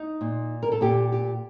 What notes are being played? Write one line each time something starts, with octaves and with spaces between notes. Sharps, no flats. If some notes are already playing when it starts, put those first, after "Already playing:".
Already playing: D#4
A#2
A#4
A4
A#2 G4
G4